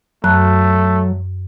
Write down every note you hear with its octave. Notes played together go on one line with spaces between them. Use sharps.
F#2 F#3 A3 A5 F#6